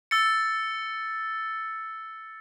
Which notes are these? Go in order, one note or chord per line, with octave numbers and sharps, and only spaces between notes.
E6 A6 C#7